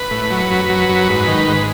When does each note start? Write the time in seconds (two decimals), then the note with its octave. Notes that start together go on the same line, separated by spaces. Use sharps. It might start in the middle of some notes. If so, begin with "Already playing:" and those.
Already playing: B4
0.11 A2
0.31 F#3
0.51 F#2
0.69 F#3
0.89 F#2
1.09 G#2
1.28 D#3
1.48 G#2